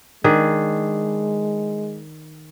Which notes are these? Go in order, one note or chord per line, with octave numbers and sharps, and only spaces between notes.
D#3 G#3 D4 G#4